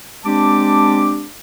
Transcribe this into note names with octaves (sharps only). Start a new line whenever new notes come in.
G#3 C4 D4 G4 A5 D6